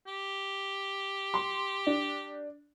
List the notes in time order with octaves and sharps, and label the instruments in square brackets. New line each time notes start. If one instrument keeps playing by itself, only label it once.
[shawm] G4
[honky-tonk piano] C6
D4